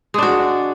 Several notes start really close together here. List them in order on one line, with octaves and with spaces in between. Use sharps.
G#3 D4 F#4